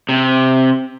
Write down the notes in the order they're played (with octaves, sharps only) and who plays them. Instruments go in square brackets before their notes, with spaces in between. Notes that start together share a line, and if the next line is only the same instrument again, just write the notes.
[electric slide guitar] C3